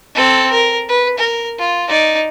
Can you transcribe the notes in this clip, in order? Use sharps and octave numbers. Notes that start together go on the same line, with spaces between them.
C4 A4
A#4
B4
A#4
F4
D#4 D5